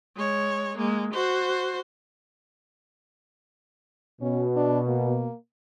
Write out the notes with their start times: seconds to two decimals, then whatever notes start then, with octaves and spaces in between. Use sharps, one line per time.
0.16 G#3 C#5
0.77 G#3 A#3
1.13 F#4 C5
4.21 B2 C#4
4.56 D4
4.88 A#3